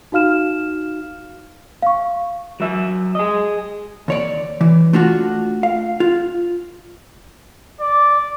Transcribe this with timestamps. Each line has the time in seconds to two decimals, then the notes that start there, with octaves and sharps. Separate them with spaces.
0.12 D#4 F#4 F5 F6 E7
1.82 F5 C#6
2.60 F#3 E5
3.15 G#4 D#5
4.08 D#2 C#5 D5
4.61 E3
4.93 A3 D4 F4 F#4
5.63 F5
6.00 F4
7.81 D5